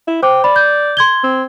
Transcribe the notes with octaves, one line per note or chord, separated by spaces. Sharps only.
E4
C5 G5 D6
D5 B5
G6
C6 G#6 G7
C4